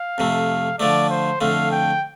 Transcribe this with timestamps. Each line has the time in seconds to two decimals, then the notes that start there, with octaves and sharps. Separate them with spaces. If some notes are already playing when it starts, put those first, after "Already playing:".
Already playing: F5
0.18 F2 C3 A3
0.79 D3 F3 A3 D5
1.10 C5
1.41 F2 D3 A3 F5
1.71 G5